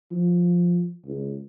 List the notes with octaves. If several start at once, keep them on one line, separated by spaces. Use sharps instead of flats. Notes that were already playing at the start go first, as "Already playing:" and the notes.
F3
C#2